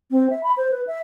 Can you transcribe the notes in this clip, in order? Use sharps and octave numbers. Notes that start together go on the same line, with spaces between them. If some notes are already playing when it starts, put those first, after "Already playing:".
C4
E5
B5
C5
B4
E5